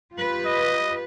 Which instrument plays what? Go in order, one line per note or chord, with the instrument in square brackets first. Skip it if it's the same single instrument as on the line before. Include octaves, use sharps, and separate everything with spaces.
[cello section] F4 G4 B4
[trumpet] D#5